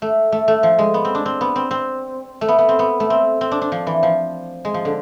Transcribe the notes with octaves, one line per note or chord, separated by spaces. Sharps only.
A3
A3
A3
F3
G#3
B3
C4
D4
C4
B3
C4
C4
A3
B3
B3
C4
B3
A3
C4
C4
D4
D4
F3
E3
F3
G#3
F3
D3